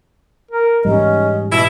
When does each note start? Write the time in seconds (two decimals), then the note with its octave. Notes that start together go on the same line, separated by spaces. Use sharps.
0.52 A#4
0.85 G#2 E3 G3 C#4 D#5
1.52 B2 E4